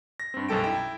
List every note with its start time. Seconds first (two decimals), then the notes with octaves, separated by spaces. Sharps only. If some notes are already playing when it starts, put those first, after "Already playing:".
0.20 A#6
0.34 G2 C4
0.49 B1 F#2 G3 A4 G5 D7
0.64 E4 G5